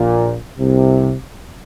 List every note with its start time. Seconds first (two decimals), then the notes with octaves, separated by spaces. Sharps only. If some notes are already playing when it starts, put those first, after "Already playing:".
Already playing: A#1 A#2
0.59 C2 C3